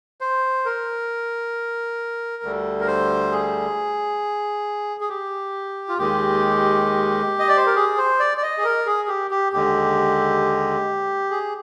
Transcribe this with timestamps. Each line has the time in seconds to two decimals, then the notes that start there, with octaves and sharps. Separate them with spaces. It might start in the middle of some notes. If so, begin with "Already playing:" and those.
0.21 C5
0.65 A#4
2.43 D2 D3 G3
2.80 A#4
2.87 C5
3.32 G#4
5.00 G#4
5.09 G4
5.89 F4
5.98 D#2 D#3 G#3 G4
7.39 D#5
7.48 D5
7.57 C5
7.66 A#4
7.76 G#4
7.98 C5
8.20 D5
8.37 D5
8.43 D#5
8.58 G#4
8.64 A#4
8.86 G#4
9.08 G4
9.31 G4
9.52 D#2 D3 G#3 G4
11.30 G#4